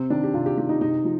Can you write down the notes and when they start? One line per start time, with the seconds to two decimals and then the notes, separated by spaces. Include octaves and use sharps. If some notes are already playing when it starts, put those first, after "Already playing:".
Already playing: C3 C4
0.10 D#3 D4
0.24 G4
0.34 C3 F4
0.46 G4
0.58 D#3 G4
0.69 D#4
0.81 C3 D#4
1.05 F3